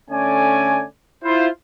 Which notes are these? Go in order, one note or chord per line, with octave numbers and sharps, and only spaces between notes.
D3 A3 C#4 D5 G#5
E4 F4 C5